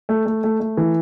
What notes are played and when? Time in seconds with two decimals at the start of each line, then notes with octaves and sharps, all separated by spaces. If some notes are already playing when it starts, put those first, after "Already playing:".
0.09 A3
0.26 A3
0.44 A3
0.60 A3
0.77 E3